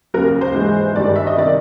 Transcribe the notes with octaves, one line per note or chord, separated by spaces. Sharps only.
D#2 C#3 F#3 A#4
C5
G#2 E3 G#3
G2 D#3 G3 D5
E5
D#5
C3 D#3 D5